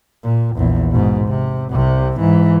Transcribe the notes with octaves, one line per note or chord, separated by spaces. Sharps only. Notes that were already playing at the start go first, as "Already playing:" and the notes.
A#2
A#1 E2
G#2 B2
C3
C2 C3
G#2 E3